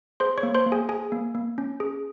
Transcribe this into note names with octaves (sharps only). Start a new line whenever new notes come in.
G#4 C5 C6
C#5 C#6
A#3
C5 C6
A#3
G#4 G#5
G#4 G#5
A#3
A#3
C#4
G#4